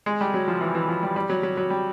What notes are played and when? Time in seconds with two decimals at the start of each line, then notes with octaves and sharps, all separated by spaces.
0.06 G#3
0.21 G3
0.34 F#3
0.48 F3
0.61 E3
0.75 E3
0.89 F3
1.03 G3
1.16 G3
1.30 F#3
1.43 F#3
1.57 F#3
1.70 G3